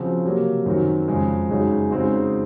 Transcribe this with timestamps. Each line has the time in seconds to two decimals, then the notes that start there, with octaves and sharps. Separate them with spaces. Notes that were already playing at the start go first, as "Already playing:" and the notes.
Already playing: C#3 F3 C4 F#4
0.25 C3 F#3 A#3
0.66 F#2 D#3 F#3 C4 F#4
1.08 F2 C#3 G#3
1.49 F#2 C#3 G#3 D#4 F#4
1.90 C#3 G#3 C4 D#4 F#4